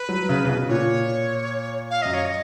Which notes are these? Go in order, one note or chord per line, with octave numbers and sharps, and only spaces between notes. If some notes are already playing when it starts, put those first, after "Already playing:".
Already playing: B4
F#3
C#3
C#3
B2
A#2 C#5
F5
F#2 D#5
C#5
D#5